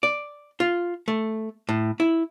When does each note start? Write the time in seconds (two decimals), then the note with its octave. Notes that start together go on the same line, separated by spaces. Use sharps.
0.03 D5
0.60 F4
1.08 A3
1.69 A2
2.00 E4